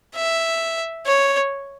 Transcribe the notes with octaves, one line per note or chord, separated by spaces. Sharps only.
E5
C#5